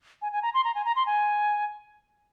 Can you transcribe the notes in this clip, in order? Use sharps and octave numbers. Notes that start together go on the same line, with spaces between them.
G#5
G#5
A#5
C6
A#5
G#5
A#5
C6
G#5